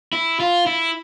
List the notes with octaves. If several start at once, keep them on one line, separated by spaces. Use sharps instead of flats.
E4
F4
E4